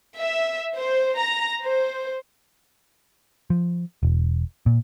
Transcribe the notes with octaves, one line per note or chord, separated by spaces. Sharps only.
E5
C5
A#5
C5
F3
E1
A#2